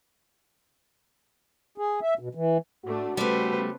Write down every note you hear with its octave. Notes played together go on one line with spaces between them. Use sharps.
G#4
E5
B2
E3
A2 A3 D4 F#4
C#3 G3 A3 B3 A4 B4 C5